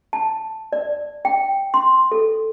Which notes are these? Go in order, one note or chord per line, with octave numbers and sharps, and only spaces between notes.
A5
D5
G5
C6
A4